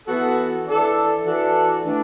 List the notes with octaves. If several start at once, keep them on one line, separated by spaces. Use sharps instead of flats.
E3 B3 F#4 A4
E3 D4 A4
E3 D4 F#4 A4
E3 A3 D4